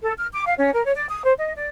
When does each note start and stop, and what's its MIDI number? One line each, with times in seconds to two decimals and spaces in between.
0.01 0.12 69
0.17 0.26 89
0.31 0.43 86
0.45 0.53 77
0.57 0.69 61
0.72 0.82 70
0.83 0.90 73
0.94 1.05 74
1.08 1.22 87
1.23 1.33 72
1.37 1.52 75
1.55 1.68 74